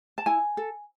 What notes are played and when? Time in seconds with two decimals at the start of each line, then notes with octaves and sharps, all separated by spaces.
0.18 A5
0.26 E4 G#5
0.57 A4